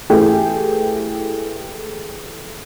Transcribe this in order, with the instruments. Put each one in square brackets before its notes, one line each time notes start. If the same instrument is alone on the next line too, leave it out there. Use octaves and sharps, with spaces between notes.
[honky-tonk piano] E3 A3 G4 G#4